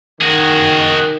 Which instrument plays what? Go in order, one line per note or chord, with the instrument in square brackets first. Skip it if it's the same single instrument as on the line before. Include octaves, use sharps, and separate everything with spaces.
[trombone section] D#3 [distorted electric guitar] F#4 G#4